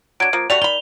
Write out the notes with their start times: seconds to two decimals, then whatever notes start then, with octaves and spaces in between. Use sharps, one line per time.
0.20 F#3 D4 G#6 D7
0.33 F3 A#3
0.50 G3 A3 F#4 D5 F7
0.62 D#3 B5 G7